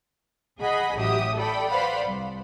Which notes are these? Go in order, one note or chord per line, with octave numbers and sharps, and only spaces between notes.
G#4 D#5 F#5 B5
A1 F#3 G4 E5 D#6
A4 D5 G5 B5
B4 C5 D5 F5 F#5 B5
C2